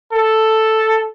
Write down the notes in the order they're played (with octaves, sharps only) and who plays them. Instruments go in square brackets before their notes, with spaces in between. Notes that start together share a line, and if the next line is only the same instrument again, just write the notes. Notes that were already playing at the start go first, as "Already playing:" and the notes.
[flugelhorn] A4